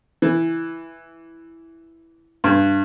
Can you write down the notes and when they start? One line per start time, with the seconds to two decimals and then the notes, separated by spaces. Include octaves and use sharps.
0.22 E3
2.44 G2